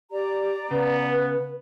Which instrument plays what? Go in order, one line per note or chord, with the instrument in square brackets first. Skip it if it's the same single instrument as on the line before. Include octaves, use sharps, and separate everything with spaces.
[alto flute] G4 [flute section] D5 A#5
[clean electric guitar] C#3 [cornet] B3 [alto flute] B4